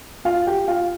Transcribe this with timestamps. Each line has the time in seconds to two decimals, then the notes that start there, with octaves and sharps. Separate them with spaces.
0.25 F4 F5
0.47 G4 G5
0.68 F4 F5